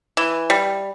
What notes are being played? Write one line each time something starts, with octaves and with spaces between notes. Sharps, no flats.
E3
G3